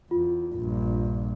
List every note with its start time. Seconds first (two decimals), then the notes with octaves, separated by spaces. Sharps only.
0.11 E2 F4
0.55 A#1 G2